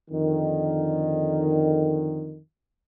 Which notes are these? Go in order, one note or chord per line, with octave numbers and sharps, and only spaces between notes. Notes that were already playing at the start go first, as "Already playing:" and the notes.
F2 D3 D#3